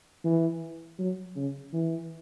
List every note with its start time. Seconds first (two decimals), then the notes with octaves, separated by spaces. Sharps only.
0.24 E3
0.99 F#3
1.36 C#3
1.73 E3